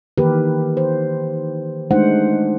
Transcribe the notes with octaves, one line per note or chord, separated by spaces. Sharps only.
D#3 E3 A#3 G4 A#4 B4
C5
G#3 A3 D4 D#4 C5 F#5